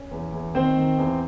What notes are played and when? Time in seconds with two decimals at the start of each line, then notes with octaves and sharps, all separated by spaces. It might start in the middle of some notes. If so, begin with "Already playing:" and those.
Already playing: C#4
0.11 E2
0.33 E2
0.54 D#3 C4 C5
0.77 D#3
0.98 E2